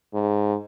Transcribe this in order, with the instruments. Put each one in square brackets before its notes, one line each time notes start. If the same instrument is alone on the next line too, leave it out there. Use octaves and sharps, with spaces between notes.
[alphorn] G#2